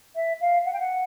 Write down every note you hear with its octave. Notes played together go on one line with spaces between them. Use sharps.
E5
F5
F#5
G5
F#5